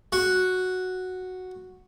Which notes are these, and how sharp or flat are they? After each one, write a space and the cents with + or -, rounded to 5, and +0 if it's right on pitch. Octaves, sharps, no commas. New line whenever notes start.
F#4 -5